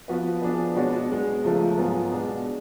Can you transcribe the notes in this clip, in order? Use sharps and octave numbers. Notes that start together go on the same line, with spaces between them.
F3 B3 F#4 B4
F3 B3 D4 G#4 B4
B2 G#3 D4 F#4 C#5
B2 G#3 B3
C#2 C#3 F3 A3
G#2 F#3 B3 F4 G#4
B2 G#3 D4